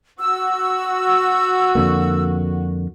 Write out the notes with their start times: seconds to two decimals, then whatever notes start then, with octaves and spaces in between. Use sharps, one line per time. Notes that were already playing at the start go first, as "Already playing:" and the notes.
0.20 F#4 E6
1.75 F2 D3 A#3